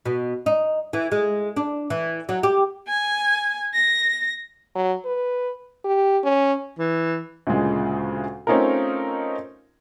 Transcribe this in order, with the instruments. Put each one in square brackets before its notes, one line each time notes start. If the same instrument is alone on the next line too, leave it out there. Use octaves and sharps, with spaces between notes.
[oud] B2
D#4
E3
G#3
D4
E3
F#3
G4
[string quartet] G#5
A#6
[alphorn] F#3
B4
G4
C#4
[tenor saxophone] E3
[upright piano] D2 A#2 C#3 G#3
A3 C4 C#4 D#4 F4 A#4